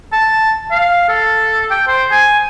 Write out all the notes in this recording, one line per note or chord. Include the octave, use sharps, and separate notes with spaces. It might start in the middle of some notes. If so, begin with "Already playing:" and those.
A5
F5
A4
G5
C5
G#5